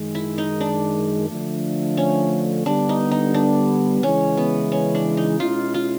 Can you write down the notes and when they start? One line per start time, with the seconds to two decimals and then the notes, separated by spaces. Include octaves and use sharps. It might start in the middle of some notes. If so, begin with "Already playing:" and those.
Already playing: F#2 D#3 G#3
0.15 E4
0.38 D#4
0.60 D4
1.29 D3 F3 A3
1.97 C#4
2.66 D3 G3 B3 D4
2.89 D#4
3.11 D#4
3.34 D4
4.03 C#3 E3 G#3 C#4
4.37 B3
4.72 C#4
4.95 D4
5.17 D#4
5.40 B2 G#3 C#4 E4 F4
5.74 F4